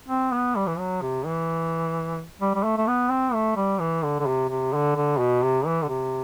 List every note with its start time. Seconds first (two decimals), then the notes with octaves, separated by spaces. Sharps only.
0.09 C4
0.32 B3
0.56 G3
0.67 E3
0.79 F#3
1.02 C3
1.26 E3
2.41 G3
2.55 G3
2.64 A3
2.78 A3
2.88 B3
3.10 C4
3.34 A3
3.57 G3
3.81 E3
4.03 D3
4.20 D3
4.27 C3
4.50 C3
4.73 D3
4.97 D3
5.19 B2
5.43 C3
5.66 E3
5.82 D3
5.89 C3